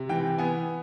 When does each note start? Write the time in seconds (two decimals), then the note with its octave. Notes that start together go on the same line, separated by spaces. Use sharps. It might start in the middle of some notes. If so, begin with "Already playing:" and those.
Already playing: C3
0.09 E3 G5
0.38 B3 G#5